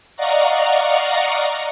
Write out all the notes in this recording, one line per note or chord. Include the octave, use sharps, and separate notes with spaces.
D5 D#5 F5 F#5 A#5 C#6